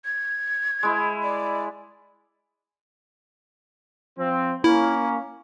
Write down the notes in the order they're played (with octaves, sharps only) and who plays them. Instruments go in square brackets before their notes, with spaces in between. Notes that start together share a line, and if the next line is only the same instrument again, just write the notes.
[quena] G#6
[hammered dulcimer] G#3 E4
[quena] D5
[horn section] F3 C4
[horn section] A#3 C#4 [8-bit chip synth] E4